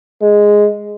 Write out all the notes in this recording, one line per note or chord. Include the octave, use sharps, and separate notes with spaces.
G#3